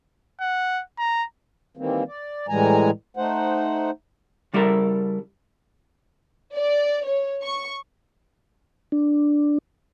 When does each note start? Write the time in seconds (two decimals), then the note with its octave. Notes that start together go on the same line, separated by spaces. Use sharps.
0.41 F#5
0.99 A#5
1.77 D#3 E3 G3 A#3 C4
2.08 D5
2.49 A2 E3 G3 G#3 G#5 A#5
3.17 A3 D#4 C5 F#5
4.54 C#3 G3 E4 A4 A#4
6.54 D5
7.05 C#5
7.42 C#6
8.92 D4